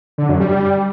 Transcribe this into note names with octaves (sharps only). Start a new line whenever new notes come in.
D3
F#2
G3